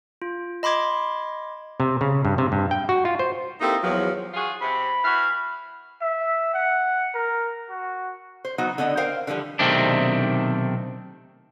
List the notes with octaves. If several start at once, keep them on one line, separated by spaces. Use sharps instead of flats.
F4
D#5 B5 C6 D6 G#6
C3
C#3
G2
C3
G2
G5
F#4
F4
C5
A#3 C4 D#4 E4 G4 A4
E2 F3 F#3
F4 F#4 G#4
C3 B5
E3 F#4 F5
E5
F#5
A#4
F#4
C5
F#3 B3 D#4 F#4
D3 B3 D4 D#5
A#4 C5 F5 G5
D3 E3 F3 G3
B1 C3 D#3 A3 C4 D4